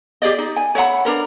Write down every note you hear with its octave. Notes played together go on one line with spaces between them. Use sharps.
G4 G#4 D5 D#5
D#4
G#5
C#5 E5 F#5 B5
D4 A#4 B4